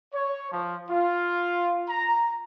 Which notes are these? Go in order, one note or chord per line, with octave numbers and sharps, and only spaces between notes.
C#5
F3
F4
A#5